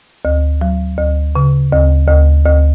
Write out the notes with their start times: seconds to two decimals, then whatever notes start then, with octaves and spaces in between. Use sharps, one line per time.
0.25 D2
0.61 F#3
0.98 D2
1.35 C#3
1.73 D2
2.08 D2
2.46 D2